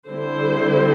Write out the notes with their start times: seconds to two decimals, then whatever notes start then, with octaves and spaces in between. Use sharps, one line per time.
0.11 D3 G3 C4 E4 C5